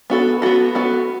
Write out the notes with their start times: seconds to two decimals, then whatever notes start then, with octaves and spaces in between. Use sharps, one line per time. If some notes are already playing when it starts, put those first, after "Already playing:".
0.10 B3 F#4 A4
0.42 B3 F#4 A4
0.75 B3 F#4 A4